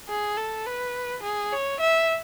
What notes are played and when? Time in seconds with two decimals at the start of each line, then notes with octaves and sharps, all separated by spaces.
0.09 G#4
0.37 A4
0.66 B4
1.23 G#4
1.52 C#5
1.80 E5